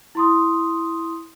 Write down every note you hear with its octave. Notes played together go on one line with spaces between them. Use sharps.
E4 C6 D#6